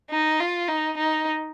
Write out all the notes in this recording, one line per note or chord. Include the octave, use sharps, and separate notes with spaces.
D#4
F4
D#4
D#4